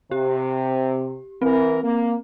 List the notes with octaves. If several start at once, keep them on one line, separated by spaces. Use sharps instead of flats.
C3 G4
E3 C4 A#4
A#3